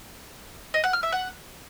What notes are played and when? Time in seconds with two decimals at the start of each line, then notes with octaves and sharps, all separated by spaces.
0.74 D#5
0.84 F#5
0.93 F6
1.03 E5
1.12 F#5